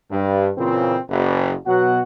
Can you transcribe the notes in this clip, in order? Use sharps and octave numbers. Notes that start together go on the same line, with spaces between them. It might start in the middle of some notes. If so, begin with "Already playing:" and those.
G2
A#2 C#3 E3 C4
F#1
B2 F#3 F#4 F#5